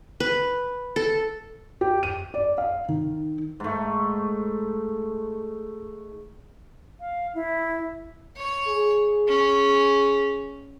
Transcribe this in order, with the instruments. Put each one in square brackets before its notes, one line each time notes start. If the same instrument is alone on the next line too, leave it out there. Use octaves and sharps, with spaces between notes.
[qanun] B4
A4
[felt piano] G4
D#7
D5
F5
D#3
[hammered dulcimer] G#2 A3
[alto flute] F5
E4
[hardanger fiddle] C#5
[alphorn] G#4
[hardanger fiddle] C#4